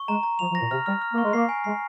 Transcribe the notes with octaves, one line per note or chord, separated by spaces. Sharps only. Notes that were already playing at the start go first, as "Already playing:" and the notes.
Already playing: C#6
G#3 A#5
A#5
F3 F7
F3
A#6
A#2
C3 F6
G3 F6
F6
A#3
C#6
G#3
A#3 C7
G#5
G#3 C7